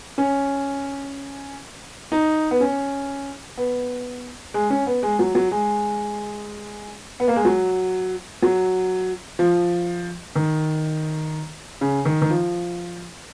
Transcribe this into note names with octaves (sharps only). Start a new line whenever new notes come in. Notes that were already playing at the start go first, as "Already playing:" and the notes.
C#4
D#4
B3
C#4
B3
G#3
C#4
B3
G#3
F#3
F#3
G#3
B3
A#3
G#3
F#3
F#3
F3
D#3
C#3
D#3
D#3
F3